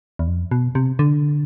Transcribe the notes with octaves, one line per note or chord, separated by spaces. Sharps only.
E2
F2
B2
C3
D3